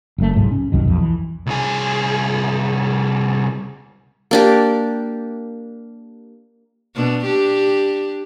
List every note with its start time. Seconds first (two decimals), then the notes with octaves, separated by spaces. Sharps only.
0.18 F#1 F#2 A3
0.34 C2 G#2 F#3
0.51 C#4
0.72 C2 F#2 D#3
0.85 B1 F2
0.98 E3
1.46 C2 G#4
4.31 A#3 D4 G4
6.95 B2 D4
7.24 D4 G4